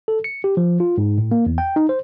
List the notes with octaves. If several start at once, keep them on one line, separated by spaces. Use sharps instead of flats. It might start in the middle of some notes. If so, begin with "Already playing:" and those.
A4
C#7
G4
F3
F4
G#2
A2
A#3
E2
G5
D#4
C5